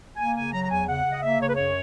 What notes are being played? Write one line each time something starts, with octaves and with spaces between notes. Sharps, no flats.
A#3 G#5
C#3 G#5
F#3 A#5
A#5
E2 G#5
C#3 F#5
C#3
D#5
A#3 E5
C#3 C#5
B4
F#2 C#5